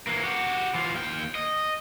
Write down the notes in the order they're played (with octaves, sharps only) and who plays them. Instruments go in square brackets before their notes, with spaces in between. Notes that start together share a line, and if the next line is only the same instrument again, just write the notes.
[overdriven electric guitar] E3 A#3
F#4 G4
E3 F4
D#2 G5
D#5